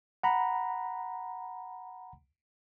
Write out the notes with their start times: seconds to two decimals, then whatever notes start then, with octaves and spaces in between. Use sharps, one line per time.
0.23 F#5 A#5 B5